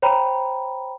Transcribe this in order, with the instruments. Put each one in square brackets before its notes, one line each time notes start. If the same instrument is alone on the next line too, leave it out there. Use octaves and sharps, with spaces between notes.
[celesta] C5 C#5 G5 A#5 B5